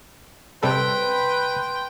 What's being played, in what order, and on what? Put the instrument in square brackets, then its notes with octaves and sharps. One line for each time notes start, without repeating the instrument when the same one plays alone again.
[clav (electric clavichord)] C3 G3 A4 [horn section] B4 [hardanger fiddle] G5 [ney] C6